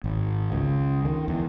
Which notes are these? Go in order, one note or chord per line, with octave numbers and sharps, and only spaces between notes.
G#1
C#2
D#3
E2